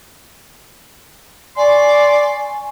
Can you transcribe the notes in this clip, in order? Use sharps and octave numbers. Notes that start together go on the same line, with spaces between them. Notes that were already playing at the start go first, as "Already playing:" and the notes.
D5 G#5 C6 C#6